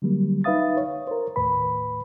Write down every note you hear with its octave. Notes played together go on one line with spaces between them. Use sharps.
D3 F#3 G3 A#3
D#4 B4 E5 F5 D#6 A6
C#5
A#4 C5
D#2 A2 B4 B5